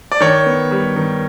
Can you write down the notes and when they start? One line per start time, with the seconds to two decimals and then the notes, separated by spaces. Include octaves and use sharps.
0.12 D5
0.20 D#3 C#5
0.46 B3
0.71 G3
0.96 D#3